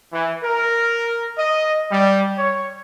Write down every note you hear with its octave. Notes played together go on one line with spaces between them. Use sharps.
E3
A#4
D#5
G3
C#5